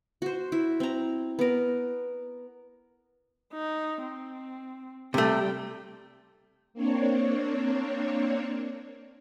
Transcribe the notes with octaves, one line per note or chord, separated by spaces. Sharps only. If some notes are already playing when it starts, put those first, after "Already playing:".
F#4 C5
E4
C4 A#5
B3 A#4
D#4
C4
C3 G3 A3 G5
A#3 C4 D4 C#5